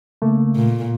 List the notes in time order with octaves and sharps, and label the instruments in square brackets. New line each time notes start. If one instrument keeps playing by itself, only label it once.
[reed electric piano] C#3 A3 A#3
[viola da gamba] A#2